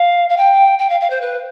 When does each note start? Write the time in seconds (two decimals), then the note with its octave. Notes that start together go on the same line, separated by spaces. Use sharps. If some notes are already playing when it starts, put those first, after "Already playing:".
Already playing: F5
0.29 F5
0.37 G5
0.78 G5
0.89 F5
1.00 F5
1.10 C5
1.21 B4